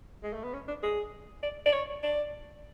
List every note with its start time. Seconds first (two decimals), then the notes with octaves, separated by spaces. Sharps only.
0.23 G#3
0.33 A3
0.43 B3
0.54 C#4
0.68 D4
0.83 G#4
1.43 D5
1.66 D5
1.73 C#5
2.03 D5